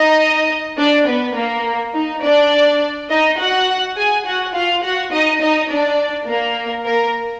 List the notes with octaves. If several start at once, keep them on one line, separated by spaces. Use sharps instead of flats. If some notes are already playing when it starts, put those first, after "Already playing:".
Already playing: D#4 D#5
D4 D5
B3 B4
A#3 A#4
D#4
D4 D5
D#4 D#5
F#4 F#5
G#4 G#5
F#4 F#5
F4 F5
F#4 F#5
D#4 D#5
D#4 D#5
D4 D5
A#3 A#4
A#3 A#4